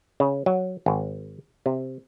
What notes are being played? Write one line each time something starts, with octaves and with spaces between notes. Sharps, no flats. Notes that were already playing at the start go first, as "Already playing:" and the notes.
C#3
F#3
G#1
C3